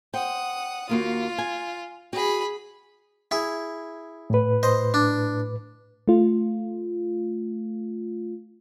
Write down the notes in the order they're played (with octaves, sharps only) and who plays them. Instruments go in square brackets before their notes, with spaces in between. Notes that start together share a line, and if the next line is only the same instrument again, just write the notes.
[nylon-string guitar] C5 G5 [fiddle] F#5 D#6
[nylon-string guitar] D#2 A#3 F#4 [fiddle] F4
[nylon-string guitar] G#5
[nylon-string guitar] F#4 [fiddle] G#4 B5
[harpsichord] E4 G#4
[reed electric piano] A2 B4
[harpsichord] C5 D#5
D4
[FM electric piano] A3 F4